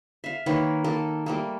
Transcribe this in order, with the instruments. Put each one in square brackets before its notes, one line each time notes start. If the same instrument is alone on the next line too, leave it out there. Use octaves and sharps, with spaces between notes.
[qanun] E5 F5
D#3 A#3 B4 C#5
A#3 A4 A5
G3 A3 A#3